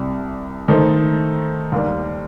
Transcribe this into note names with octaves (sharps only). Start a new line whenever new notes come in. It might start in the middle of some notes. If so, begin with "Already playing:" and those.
Already playing: C2 C3 G3
D#3 A3 D#4 A4 C5
D#2 D#3 G3